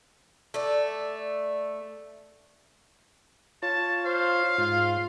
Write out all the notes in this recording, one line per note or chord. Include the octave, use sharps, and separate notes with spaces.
A3 D5
F4 C#5 A5
C5 F5
G#2 F4